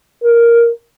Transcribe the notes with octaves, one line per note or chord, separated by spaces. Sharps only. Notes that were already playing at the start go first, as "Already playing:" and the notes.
A#4